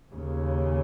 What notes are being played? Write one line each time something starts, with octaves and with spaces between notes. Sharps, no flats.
D#2 C#3